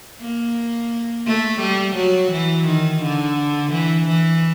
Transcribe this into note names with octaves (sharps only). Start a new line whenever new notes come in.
A#3
A3
G3
F#3
E3
D#3
D3
E3
E3